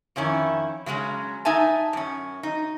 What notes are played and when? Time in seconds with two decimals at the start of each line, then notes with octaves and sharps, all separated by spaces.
0.16 F2 D#3 C#4 E4
0.86 C#3 F#3 G#3 C#4
1.45 D#4 E5 G#5 A5
1.93 F#2 C#4
2.43 D#4